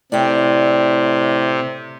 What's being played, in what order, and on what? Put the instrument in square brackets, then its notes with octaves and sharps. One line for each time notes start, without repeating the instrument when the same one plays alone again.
[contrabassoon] A2 [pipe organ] C3 [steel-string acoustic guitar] D5 G5